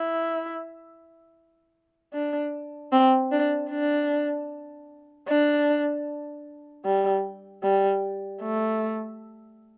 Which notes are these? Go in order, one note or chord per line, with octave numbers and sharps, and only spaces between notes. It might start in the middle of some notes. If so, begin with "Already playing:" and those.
Already playing: E4
D4
C4
D4
D4
D4
G3
G3
A3